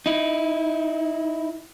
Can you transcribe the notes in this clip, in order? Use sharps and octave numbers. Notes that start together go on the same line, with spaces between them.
D#4 E4